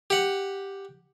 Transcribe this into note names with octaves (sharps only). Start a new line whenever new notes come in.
G4 F#5